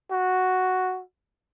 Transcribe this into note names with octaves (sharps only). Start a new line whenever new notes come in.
F#4